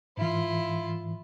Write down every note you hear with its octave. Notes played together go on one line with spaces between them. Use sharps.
G#2 E3 E4 F4